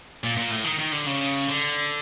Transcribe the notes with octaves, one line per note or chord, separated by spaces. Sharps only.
A#2
A#2
A2
D#3
D#3
D3
C#3
D3